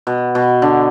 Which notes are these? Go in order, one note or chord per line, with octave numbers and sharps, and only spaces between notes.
B2
B2
D3